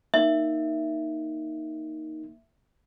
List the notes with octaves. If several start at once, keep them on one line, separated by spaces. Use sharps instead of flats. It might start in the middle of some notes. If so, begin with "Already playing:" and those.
A#3 D#4 E5